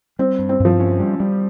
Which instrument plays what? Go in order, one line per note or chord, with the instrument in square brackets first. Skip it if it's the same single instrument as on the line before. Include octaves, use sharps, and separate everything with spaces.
[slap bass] G3 [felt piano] C4
[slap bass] G2
[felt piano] C4
[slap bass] G2
[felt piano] F3
[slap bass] C#4
G3
G3